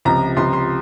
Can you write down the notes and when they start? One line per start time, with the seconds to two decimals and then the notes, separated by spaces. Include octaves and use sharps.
0.05 C#2 C3 F3 A#5
0.37 C#2 C3 F3 C6
0.53 C6